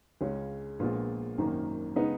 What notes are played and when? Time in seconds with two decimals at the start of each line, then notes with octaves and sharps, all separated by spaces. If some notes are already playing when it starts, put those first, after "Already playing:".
0.21 C#2 C#3 G#3 C#4
0.79 A#1 A#2 G#3 B3 F4
1.38 G#1 F#2 D#3 A#3
1.96 C#3 G#3 B3 D#4